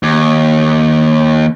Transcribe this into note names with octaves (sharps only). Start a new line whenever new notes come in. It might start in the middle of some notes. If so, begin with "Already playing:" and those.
D#2